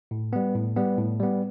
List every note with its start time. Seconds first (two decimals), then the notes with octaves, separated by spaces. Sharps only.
0.11 A2
0.33 G3 B3
0.55 A2
0.77 G3 B3
0.98 A2
1.20 G3 B3